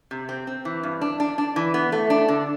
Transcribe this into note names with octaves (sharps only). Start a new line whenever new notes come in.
C3
C4
C4
E3
G2
D4
D4
D4
E3
B3
A3
D4
D3